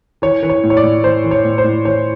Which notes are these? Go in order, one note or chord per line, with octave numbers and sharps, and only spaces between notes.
E3 C#5
E3
C#5
A2
C#5
D5
A2
E3 C5
E3
C#5
A2
C5
A2
E3 C#5